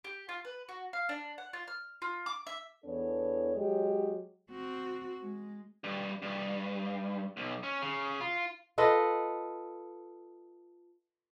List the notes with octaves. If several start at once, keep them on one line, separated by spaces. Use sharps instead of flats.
G4
F4
B4
F#4
F5
D4
F#5
F4
F6
F4
D6
E5
E2 E3 B3 D4 A4 C#5
F#3 G#3 G4
C4 F#4
G#3
G2
G2
B1
C#4
C#3
F4
F4 A4 B4 D#5